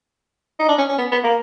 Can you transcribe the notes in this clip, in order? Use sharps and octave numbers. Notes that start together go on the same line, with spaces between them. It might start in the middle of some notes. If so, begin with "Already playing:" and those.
D#4
D4
C#4
C#4
B3
B3
A#3